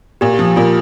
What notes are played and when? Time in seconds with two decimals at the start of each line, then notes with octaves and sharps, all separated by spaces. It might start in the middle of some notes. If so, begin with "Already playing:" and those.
0.21 A#2 G4
0.34 G4
0.39 F3
0.45 G4
0.56 A#2 F4